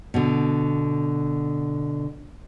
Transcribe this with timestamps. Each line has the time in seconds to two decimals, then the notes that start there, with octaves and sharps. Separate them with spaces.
0.14 B2 D3